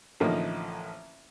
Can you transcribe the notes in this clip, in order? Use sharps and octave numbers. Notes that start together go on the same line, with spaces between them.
A1 D3 F3 A#3 D#4